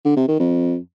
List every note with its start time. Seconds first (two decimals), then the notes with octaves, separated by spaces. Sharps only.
0.05 D3
0.16 C3
0.28 D#3
0.39 F2